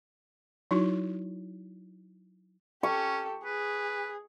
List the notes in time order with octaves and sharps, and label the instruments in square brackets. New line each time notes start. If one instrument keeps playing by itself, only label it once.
[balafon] F#3 D#4 E4 F#4
[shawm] C#4 [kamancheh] G4 A4 [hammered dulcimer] C#6
[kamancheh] G#4 [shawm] B4